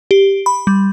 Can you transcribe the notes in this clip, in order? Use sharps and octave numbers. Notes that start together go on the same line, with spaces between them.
G4
B5
G3